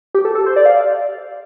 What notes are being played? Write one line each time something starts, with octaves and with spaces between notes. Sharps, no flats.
G4
A4
A4
C5
D5
F5